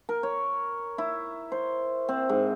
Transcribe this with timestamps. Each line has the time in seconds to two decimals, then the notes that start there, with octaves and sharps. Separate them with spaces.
0.09 A#4
0.23 C#5
0.98 E4
1.52 C5
2.09 C4
2.29 G#2